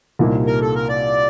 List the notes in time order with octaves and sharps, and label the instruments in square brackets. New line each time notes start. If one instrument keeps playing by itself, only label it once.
[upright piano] C2 A#2 G3 A#3 D#4
[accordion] A#4
A4
A#4
D5